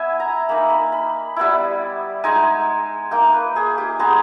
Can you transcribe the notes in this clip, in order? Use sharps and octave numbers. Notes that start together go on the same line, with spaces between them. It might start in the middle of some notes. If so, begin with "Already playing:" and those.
Already playing: B3 E4 E5 G#5
A#5
A#3 D#4 B5
B5
B5
G3 B3 E4
G#3 D#4 G#5
A#3 D#4 G5
B4
G#4
G4
G#3 B3 D#4 G#4